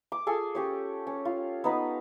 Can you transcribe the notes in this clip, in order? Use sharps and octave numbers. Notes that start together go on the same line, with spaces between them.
D6
F4 G#4 A4 G#5
C#4 G4 C#5
C#4
F4
B3 D#4 B5 D#6